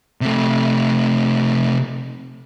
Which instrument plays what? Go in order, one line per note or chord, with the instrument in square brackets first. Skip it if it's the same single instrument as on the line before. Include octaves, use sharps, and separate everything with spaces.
[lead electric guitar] C3 A3